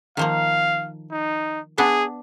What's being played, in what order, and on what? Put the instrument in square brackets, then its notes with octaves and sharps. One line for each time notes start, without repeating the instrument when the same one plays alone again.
[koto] D#3 F3 A#3 [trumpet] F5
[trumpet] D#4
[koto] B3 D4 [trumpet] G#4